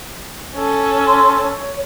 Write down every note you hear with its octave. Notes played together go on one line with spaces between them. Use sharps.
C#4 A4
C6
C#5